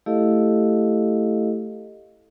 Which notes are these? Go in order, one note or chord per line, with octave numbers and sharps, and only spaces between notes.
A3 E4 G4 A4 D#5 F5